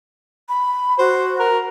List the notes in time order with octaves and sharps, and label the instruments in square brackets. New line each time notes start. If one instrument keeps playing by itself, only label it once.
[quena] B5
[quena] F#4 [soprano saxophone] C5
[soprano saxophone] A#4